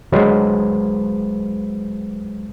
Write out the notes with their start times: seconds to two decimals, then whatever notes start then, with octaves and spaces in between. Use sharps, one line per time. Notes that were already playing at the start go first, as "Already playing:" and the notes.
0.12 D2 F#3 G#3 B4 C5